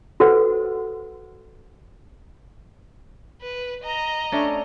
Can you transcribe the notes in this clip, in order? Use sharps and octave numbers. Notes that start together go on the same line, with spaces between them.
F#4 A4 B4 C5 F#5
B4
D#5 A#5
A3 C#4 D4